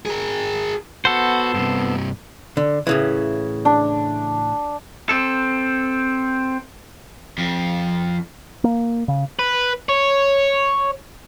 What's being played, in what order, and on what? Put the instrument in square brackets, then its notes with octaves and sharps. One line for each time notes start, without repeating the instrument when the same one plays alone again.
[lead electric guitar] G#4 A#4
[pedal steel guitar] B3 A4 C5 [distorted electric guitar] F#4
[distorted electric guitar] G2 C3
[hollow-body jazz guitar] D3
A2 C#3 E3
[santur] D4
[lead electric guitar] C4 A4
[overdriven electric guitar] F2 F3
[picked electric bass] A#3
C#3
[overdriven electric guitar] B4
C#5